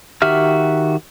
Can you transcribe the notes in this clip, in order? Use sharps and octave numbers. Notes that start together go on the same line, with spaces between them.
D#3 F#4 G4 E5 F6